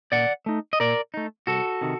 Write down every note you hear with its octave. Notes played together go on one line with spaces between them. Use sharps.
A#2 D5 F#5
A3 D#4
D#5
A#2 A#4 D5
A3 D#4
C2 F#4 A4
C3 D#3